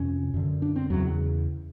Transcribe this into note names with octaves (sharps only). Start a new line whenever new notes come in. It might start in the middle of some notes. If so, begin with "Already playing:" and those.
Already playing: F2 C3 C#4
F#2 D3
D4
C4
E2 C#3 F#3